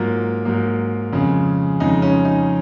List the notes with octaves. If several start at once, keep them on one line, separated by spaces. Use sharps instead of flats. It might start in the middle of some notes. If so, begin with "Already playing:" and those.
Already playing: G#2 F#3 A#3 F4
G#2 F#3 A#3
F2 C#3 G#3
F2 C#3 G#3 D#4
C#4
D#4